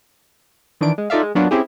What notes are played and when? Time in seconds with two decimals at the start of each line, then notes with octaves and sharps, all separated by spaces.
0.81 D#3 E3 D4 D7
0.98 G#3
1.10 D#4 F4 A4 D5 E5 F5
1.23 G#3
1.35 F#3 A#3 B3 D4 F4 F#4
1.51 C4 C#4 E4 G4 G#4